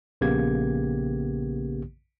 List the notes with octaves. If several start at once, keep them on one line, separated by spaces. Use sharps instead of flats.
A#1 C#3 A#3 B3 G4 G#6